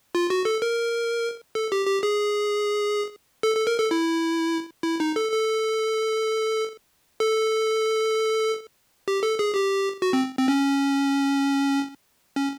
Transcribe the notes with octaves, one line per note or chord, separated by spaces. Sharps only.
F4
F#4
A4
A#4
A4
G4
G4
G#4
A4
A4
A#4
A4
E4
E4
D#4
A4
A4
A4
G4
A4
G#4
G4
F#4
C4
C4
C#4
C#4